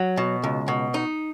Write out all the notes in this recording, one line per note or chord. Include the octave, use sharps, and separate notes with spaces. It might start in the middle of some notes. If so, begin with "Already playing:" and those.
Already playing: F#3
B2
C#2
B2
D#4